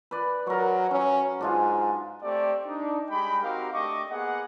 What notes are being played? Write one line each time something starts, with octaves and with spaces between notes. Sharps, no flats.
B4 D5
F#3 A#4 C#6
F#3 C#4
G#2 D4 F4 G#4
A3 C4 G4 D5
D4 D#4
G3 G#3 G4 G5 B5
C4 D#4 F#4 G4 A#4 F5
A3 D4 G4 D#5 C#6 D6
A#3 B3 G#4 D#5 F#5